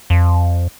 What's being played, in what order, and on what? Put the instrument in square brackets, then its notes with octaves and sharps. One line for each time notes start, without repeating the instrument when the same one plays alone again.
[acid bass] F2